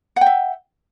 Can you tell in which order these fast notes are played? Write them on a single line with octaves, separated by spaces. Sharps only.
F#5 G5 E5